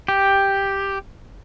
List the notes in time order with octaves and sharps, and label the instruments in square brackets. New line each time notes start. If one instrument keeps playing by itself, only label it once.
[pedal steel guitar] G4